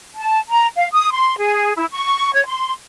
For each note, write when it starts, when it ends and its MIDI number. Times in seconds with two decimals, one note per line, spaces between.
0.16 0.38 81
0.49 0.67 82
0.76 0.87 77
0.93 1.09 87
1.12 1.35 84
1.38 1.72 68
1.77 1.86 64
1.91 2.31 85
2.34 2.44 73
2.47 2.71 84